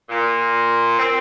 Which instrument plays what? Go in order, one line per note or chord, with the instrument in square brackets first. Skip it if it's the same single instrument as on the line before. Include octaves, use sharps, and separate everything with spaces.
[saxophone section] A#2
C4